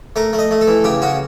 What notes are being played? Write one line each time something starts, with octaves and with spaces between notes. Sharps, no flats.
A3 A#4
A3
D#5
A3
A4
E3
C#3 G4
C#3 F#4